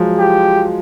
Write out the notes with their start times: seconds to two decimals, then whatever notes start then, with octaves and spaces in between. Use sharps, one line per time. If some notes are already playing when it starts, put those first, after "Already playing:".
Already playing: F3 F#3 G#3
0.18 G4